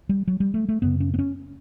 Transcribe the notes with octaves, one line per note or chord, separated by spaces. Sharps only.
G3
F#3
G3
A3
A3
F#2 C#3 B3
C#4
B3
C#4